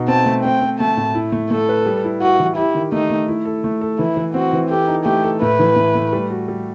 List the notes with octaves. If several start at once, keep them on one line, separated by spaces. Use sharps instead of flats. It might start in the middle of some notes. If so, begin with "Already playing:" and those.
Already playing: B2 D#4 F#4
C4 A5
A3
C4 G5
C4
A3 A5
A2
E4
A3
A3 A4
B4
G3
E4
E4 F#4
E3
E4 G4
D#3
A3 D#4
A3
E4
A4
A3
A4
E3 E4
E3
C4 F#4
E3
G4 A4
D#4
A3 G4
A4
A2 B4
E3
A2
A3
G3
F#4
G3